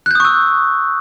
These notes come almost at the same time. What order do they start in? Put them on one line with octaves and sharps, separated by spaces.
F#6 G6 D#6 C#6 E6